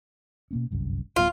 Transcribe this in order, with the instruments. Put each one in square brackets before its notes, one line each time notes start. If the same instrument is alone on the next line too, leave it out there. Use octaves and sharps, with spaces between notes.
[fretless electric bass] B2 A#3 C#4
G1 C2 F#2
[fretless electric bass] D1 F#3 B3 [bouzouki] F4